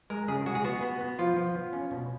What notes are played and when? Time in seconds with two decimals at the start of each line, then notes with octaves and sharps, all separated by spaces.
0.10 G#3 A#4
0.28 C#3 G#4
0.46 G#3 F#4
0.55 G#4
0.64 B3 F#4
0.83 B3
1.01 B3
1.19 F3 F4
1.37 F3
1.55 B3
1.73 C#4
1.91 B2